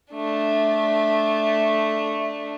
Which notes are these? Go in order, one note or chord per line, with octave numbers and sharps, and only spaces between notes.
A3 D4